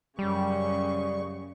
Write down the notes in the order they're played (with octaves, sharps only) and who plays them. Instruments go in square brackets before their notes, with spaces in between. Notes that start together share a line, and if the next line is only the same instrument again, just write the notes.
[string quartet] F#2 C#3 C#6 [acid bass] G3